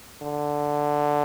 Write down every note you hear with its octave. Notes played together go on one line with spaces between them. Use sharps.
D3